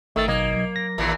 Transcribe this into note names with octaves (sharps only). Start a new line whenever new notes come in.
G#1 D#3 A3 E6 A6
B1 A#3 D#5 G#6
F#3
A#6
A1 D#2 A#2 E3